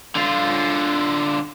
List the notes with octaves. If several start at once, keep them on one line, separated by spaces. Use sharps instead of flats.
D3 F4